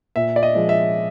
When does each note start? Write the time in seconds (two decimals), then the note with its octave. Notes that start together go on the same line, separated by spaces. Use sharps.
0.16 A#2 E5
0.36 D5
0.43 D#5
0.55 F3 G#3
0.69 E5